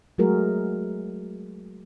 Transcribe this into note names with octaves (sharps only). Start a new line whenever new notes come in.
F#3 G#3 A3 F#4 G#4 A#4